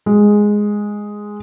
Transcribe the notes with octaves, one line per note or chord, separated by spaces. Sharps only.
G#3